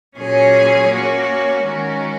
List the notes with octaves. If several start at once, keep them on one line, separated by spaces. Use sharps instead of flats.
A#2 F#3 C#4 G#4 C#5
A#3 C#4 F#4 C#5
D#3 G#3 C#4 F#4 A#4